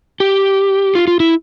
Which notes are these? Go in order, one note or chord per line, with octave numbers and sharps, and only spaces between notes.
G4
F4
F4
E4